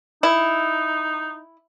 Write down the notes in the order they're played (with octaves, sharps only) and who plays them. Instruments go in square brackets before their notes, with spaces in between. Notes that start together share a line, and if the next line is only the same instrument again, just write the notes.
[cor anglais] D#4 [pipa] E4